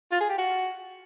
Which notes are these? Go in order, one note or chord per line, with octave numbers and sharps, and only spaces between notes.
F4
G#4
G4
F#4